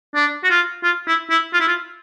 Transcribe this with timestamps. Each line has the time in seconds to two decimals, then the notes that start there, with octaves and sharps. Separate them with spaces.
0.15 D4
0.44 F#4
0.50 F4
0.83 F4
1.07 E4
1.30 E4
1.54 F4
1.60 E4
1.68 F4